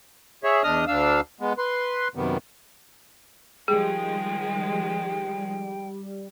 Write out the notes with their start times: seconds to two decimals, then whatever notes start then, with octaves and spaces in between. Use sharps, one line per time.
0.44 G#4 C#5 E5
0.64 E2 D4 D#5 D#6 F6
0.88 D2 D4 F5 E6
1.40 G#3 B3
1.58 B4 C6
2.15 F#2 C3 D#3 G3 B3
3.68 D#3 F3 G3 G#3 G#4 G5